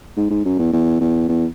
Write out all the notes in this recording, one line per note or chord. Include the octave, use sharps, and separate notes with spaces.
G#2
G#2
F#2
E2
E2
E2
E2